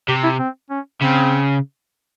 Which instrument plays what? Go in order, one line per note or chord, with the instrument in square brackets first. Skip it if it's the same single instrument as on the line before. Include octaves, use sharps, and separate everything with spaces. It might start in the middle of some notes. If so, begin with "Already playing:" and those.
[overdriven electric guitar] C3 [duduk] G4
[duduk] E4
C4
C#4
[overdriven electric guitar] C#3 [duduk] C4